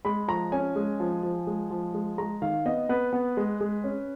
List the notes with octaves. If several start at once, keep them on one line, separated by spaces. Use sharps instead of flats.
G#3 B5
F3 A#5
C#4 G#5
G#3
F3
F3
G#3
F3
G#3
G#3 A#5
D#3 F5
B3 D#5
B3 B4
B3
G#3
G#3
C#4